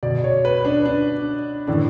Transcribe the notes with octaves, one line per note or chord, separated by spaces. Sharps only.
B2 D5
C#5
B4
D4
D4
A2 E3 D4